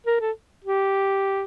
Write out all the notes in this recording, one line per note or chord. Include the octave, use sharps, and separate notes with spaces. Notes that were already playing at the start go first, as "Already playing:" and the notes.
A#4
A4
G4